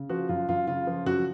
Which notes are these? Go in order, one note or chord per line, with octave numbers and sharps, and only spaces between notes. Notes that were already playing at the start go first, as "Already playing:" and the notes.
Already playing: C#3
F3 F#4
F#2 F4
F#2 F4
C#3 F4
F3
F#2 F#4